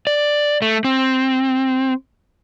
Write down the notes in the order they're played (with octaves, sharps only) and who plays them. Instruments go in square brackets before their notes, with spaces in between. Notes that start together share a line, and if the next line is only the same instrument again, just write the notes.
[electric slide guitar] D5
A3
C4